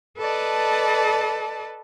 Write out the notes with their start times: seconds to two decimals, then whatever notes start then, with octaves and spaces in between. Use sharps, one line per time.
0.18 A4 B4 D5 D#5 A5